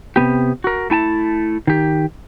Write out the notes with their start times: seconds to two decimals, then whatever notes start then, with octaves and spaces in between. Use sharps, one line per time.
0.16 C3 E3 B3 G4
0.64 F#4 A#4
0.90 A3 E4 G#5 A5
1.67 D#3 G4